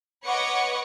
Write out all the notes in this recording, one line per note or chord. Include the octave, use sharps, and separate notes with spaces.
B4 C#5 D#5 F#5 C#6 D6